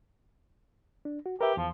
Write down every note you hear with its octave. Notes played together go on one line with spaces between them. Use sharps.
D4
F#4
G4 A#4 B4 E5
E2 F3